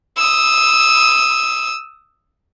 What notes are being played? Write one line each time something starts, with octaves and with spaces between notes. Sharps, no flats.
D#6 E6